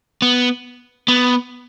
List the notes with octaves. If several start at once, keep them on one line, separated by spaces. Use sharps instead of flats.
B3
B3